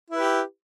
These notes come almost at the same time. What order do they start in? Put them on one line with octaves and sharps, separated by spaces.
E4 B4 G4